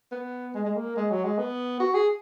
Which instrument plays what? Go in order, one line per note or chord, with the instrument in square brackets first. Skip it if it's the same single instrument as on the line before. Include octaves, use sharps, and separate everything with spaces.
[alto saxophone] B3
G#3
G#3
A#3
G#3
F#3
G#3
B3
F#4
G#4